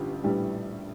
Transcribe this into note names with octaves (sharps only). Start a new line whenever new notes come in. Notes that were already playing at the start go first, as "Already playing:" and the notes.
Already playing: A1 G2 D3 F4 G4
A#1 A2 E3 G3 G4